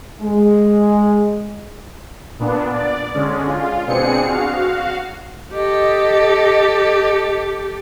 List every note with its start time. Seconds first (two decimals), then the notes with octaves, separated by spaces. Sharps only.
0.22 G#3
2.39 A#2 B3 D4
2.74 D5
3.15 D3 G#3 C#4
3.47 F4
3.87 B2 C4 D4 G#4 C#7
4.28 F#4 F5
5.53 G4 A4 D#5